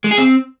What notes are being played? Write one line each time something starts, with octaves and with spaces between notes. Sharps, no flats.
G#3
G#4
C4